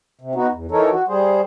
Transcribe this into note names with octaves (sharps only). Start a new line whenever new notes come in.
C3
B3 D#4 F#4
E2
E3 D#4 A4 A#4 C#5
F#4
G3 G#4 C5